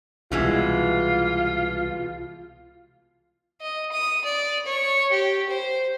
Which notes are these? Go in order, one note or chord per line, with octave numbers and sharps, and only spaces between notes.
C2 B2 E3 G#3 F4
D#5
D#6
D5
C#5
G4
C5